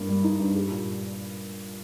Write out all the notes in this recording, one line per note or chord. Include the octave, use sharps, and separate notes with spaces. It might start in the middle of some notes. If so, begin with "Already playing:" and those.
Already playing: G2 A#3
G3
D#4
G2
G4
A#2